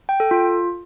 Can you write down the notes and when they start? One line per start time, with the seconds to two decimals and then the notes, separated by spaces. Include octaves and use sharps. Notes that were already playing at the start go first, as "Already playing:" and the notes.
0.09 G5
0.20 A4
0.31 F4